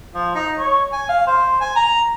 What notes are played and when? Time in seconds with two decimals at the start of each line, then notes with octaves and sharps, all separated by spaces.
0.15 F3
0.35 D#4
0.58 C#5
0.93 G#5
1.09 F5
1.27 C5
1.61 G#5
1.76 A#5